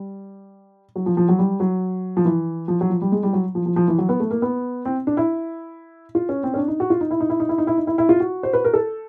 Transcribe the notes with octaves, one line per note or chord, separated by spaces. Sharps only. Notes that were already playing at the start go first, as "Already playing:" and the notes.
Already playing: G3
F#3
F3
F3
F#3
G3
F#3
F3
E3
F3
F#3
F3
G3
G#3
G3
F#3
F3
F3
F3
E3
F#3
B3
A3
A#3
B3
C4
D4
E4
F4
C#4
C4
C#4
D4
D#4
F#4
F4
D#4
E4
D#4
E4
D#4
E4
D#4
E4
D#4
E4
E4
F4
F#4
C5
B4
A#4
A4